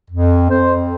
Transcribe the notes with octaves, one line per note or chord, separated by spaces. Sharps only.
F2
F2 C5